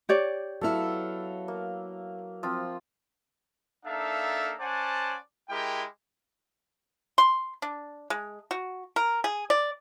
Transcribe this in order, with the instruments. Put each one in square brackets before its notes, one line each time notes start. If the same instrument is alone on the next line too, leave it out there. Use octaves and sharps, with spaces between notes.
[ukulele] G4 C#5 D5
[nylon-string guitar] F#3 B3 E4 [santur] A4 F5 E6
[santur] A#3
F3 C4 F4
[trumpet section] A#3 D4 D#4 A4 E5 F5
C#4 C5 D5 F#5 G#5 A5
G#3 E4 G4 A#4 G5
[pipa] C6
D4
G#3
F#4
A#4
G#4
D5